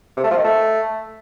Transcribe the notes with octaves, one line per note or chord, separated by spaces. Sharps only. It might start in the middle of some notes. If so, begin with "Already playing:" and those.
C3
A3
F3
D#3
A3